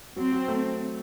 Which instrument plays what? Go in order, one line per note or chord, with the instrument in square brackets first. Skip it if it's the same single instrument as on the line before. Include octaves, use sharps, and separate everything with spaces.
[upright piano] F#3 [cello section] C4
[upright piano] F#3
A3